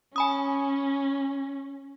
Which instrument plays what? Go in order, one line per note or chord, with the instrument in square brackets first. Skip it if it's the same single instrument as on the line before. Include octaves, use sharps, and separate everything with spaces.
[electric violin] C#4 [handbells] G#5 B5 D#6